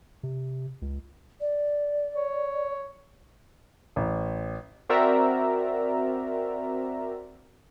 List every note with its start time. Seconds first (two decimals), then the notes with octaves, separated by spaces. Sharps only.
0.23 C3
0.82 C#2
1.40 D5
2.16 C#5
3.96 A1
4.89 C4 F#4 A#4 D5 E5 A#5